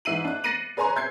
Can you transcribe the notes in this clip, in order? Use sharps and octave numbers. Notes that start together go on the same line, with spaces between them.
G#2 E3 E5 C7 D#7 F#7
D4 F#6
A6 A#6 C7 C#7 D#7 F#7
G#4 B4 C#5 G#5 A#5 C6
E5 G6 G#6 C7